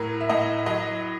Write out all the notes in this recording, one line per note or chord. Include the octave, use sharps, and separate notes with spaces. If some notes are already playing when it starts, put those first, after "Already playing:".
Already playing: A2 F#3 A#4
E5
A2 D#5
F#3 D#5